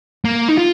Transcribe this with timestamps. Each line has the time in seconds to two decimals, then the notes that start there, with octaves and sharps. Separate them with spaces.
0.25 A#3
0.48 D#4
0.57 F4